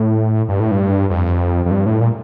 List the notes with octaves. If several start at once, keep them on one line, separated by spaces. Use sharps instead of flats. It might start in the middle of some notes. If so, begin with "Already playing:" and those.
Already playing: A2
G2
A2
G2
F2
F2
G2
A2
A#2